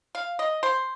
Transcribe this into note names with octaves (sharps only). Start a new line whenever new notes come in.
F5
D#5
C5